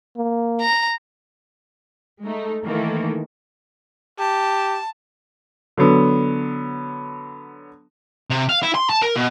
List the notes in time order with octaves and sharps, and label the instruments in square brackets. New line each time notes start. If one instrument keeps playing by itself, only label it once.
[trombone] A#3
[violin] A#5
[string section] G#3 A3 D#4
D#3 E3 A3 A#3
[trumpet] G4 [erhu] A5
[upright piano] D3 F#3 B3
[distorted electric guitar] C3
F5
E4
C6
A5
A#4
B2